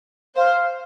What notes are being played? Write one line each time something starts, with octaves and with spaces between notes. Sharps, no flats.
C5 F5